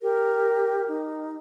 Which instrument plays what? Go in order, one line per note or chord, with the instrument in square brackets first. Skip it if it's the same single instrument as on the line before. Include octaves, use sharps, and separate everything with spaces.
[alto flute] G4 [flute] A#4
[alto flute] D#4